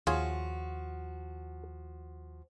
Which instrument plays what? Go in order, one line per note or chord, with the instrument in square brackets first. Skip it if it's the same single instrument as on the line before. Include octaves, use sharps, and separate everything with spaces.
[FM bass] D#2 [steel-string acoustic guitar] F3 F#4 [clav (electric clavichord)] F4 G#4 C#5